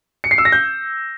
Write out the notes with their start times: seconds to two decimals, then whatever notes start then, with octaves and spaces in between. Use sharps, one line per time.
0.24 C#7
0.31 C7
0.38 E6
0.45 A#6
0.52 G6